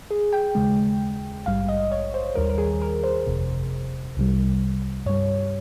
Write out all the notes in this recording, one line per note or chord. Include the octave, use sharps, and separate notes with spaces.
G#4
G5
D#2 C#3 G#3
A#1 G#2 G3 F5
D#5
C#5
C5
D#2 D#3 G3 A#4
A#4
G#4
A#4
C5
G1 F2 C3
C2 C3 G3
G2 G3 C#5